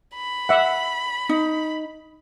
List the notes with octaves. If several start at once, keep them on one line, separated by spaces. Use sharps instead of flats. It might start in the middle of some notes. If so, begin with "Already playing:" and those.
B5
E5 F#5
D#4